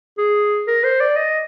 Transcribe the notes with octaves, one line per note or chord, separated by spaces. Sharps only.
G#4
A#4
C5
D5
D#5